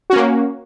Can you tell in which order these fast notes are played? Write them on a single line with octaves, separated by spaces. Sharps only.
F#4 C#4 A#3